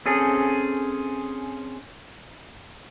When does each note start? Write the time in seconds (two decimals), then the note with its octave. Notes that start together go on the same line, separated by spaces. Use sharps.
0.06 C4 C#4 G#4 A4